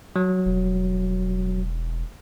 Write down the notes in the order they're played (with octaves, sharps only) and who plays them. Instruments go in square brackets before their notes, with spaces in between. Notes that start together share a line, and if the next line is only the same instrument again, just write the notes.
[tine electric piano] F#3
[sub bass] E1